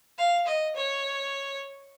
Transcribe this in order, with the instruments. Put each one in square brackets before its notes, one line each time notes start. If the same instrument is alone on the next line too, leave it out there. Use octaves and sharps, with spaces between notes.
[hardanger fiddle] F5
D#5
C#5